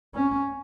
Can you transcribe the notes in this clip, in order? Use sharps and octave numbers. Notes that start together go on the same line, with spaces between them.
C#4